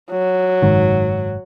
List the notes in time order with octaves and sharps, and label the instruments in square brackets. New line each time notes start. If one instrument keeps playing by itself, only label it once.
[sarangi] F#3
[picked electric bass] F#1 G#2 D#3